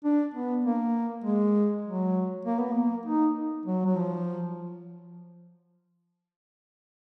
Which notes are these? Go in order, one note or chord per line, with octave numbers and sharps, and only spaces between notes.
D4
B3
A#3
G#3
F#3
A#3
B3
A#3
D#4
F#3
F#3
F3